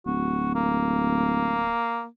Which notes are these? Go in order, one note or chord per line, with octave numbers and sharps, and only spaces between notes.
D1 F#4
A#3